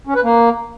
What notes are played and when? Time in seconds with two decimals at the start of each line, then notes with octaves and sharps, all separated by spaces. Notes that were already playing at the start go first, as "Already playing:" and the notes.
0.07 C#4
0.15 B4
0.24 A#3